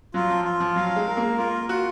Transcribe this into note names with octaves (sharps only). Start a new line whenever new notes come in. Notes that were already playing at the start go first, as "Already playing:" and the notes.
F#3 F4
F3
F4
F3
F#3 F5
G#3
A#4
A#3
A#3 F4
F4 F#4